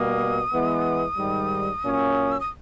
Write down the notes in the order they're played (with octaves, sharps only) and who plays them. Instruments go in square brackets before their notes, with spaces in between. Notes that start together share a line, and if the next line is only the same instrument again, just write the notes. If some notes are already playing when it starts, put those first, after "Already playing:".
Already playing: [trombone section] B2 G3 A#3 [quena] D#6
[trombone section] E3 G#3 B3
G#2 D#3 G3
A#2 F#3 A#3 C#4
[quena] E6
D#6